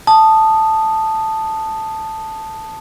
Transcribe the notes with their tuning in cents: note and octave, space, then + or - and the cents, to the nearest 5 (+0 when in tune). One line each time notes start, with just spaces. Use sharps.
A5 +0 D#6 -10